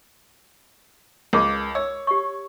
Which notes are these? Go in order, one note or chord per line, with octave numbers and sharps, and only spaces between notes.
C#2 A#4 D6
C#5 E6
G4 C#6